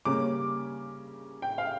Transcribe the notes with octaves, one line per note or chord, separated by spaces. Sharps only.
C#3 G3 A#3 C#4 D6
G5
F5